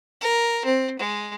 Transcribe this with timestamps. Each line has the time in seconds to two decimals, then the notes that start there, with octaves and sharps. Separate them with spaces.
0.21 A#4
0.65 C4
0.99 G#3